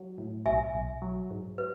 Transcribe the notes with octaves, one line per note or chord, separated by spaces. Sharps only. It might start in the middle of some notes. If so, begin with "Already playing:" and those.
Already playing: F#3
A2
B1 E5 G#5
B1
F#3
G#2
B4